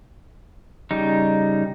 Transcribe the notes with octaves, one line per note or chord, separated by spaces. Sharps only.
C#3 G3 D#4